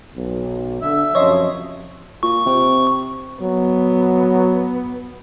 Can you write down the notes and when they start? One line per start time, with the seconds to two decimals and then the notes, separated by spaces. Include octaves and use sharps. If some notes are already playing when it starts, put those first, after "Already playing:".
0.15 B1
0.82 D3 E5
1.15 F#2 C3 F3 C#5 D#5 C6
2.23 A#2 C#6
2.46 C3
3.41 F#3 B3